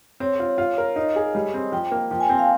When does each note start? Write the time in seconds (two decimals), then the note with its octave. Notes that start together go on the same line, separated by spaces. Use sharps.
0.20 C4 C#5
0.40 F4
0.58 F4
0.78 A#4
0.96 D#4 D#5
1.16 G#4
1.35 G3
1.54 C4
1.72 F3 G5
1.91 A#3
2.11 F3 G5
2.20 G#5
2.29 C4 G5
2.39 F5